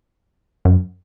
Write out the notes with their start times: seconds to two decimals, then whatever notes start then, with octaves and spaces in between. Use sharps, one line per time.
0.65 F#2